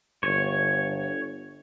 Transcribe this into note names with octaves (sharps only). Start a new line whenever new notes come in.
G1 C#5